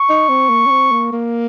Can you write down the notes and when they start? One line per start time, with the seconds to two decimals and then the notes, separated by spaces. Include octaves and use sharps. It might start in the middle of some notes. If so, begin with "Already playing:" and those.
Already playing: C#6
0.09 D#4
0.29 C4
0.49 A#3
0.66 C#4
0.70 C4
0.91 A#3
1.13 A#3